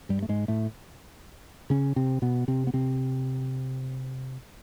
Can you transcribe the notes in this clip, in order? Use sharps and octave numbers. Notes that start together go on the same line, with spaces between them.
G2 G3
A3
G#2 G#3
A2 A3
C#3 C#4
C3 C4
B2 B3
C3 C4
B3
C3 C4